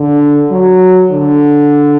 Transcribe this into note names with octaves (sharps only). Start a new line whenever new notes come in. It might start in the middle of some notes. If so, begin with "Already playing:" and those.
Already playing: D3
F#3
D3